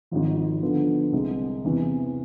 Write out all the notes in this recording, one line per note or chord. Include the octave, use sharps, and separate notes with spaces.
G#1 G#2 F3
D3 F3 B3
C2 C3 G#3
E2 C3 E3